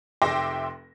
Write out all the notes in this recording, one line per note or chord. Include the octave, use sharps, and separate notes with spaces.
F1 E5 G5 C6 D6 A#6